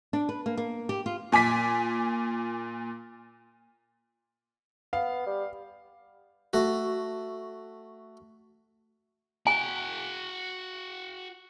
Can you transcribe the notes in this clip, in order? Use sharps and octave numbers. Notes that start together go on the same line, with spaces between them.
D4
B4
A#3
A#3
G4
F4
A#2 G#5 D6 B6
B3 F5
G3
A3 F#4
F#4 G5 G#5